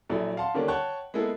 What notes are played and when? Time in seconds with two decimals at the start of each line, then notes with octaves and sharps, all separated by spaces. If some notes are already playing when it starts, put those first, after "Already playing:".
0.10 A#1 F#3 E4 A4
0.37 F5 F#5 A5 C6
0.54 D3 D#3 G3 A#3 C#4 D4
0.68 C#5 F#5 G5 A5 C#6 F#6
1.14 G#3 A#3 B3 E4 G#4 A4